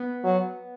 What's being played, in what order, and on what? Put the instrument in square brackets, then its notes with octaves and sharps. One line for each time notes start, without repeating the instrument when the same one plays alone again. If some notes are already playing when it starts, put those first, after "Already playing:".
Already playing: [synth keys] B3
[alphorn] F#3